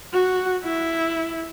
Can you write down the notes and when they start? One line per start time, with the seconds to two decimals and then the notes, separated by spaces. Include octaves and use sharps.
0.13 F#4
0.64 E4